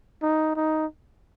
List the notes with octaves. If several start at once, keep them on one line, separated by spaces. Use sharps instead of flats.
D#4
D#4